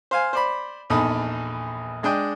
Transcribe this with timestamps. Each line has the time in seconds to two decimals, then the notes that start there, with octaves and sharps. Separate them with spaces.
0.11 C5 F5 G#5
0.33 C5 D5 B5
0.90 A#1 E2 D#4 A4 B5 D#6
2.03 G#3 D4 D#5 G5